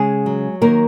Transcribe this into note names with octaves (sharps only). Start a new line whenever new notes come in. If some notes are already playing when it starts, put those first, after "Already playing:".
Already playing: C#3 G#3 G#4
F#3
D#3 A#3 A#4